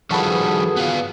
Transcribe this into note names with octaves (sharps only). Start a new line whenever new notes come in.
D#3 F3 G3 F#4 G#4 A4 B4
B3 F4